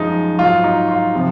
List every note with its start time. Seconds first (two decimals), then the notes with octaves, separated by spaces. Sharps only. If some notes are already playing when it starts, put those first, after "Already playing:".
Already playing: F#2 F3 G#3 D#4
0.39 G#2 F#3 F4
0.64 D#4
0.88 F4
1.15 C3 F3